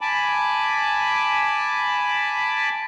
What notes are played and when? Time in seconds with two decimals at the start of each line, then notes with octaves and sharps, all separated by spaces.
0.01 G#5 A5 B5 D6